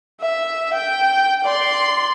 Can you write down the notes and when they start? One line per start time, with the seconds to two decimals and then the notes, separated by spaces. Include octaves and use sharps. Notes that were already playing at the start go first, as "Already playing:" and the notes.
0.21 E5
0.74 G5
1.45 D5 C6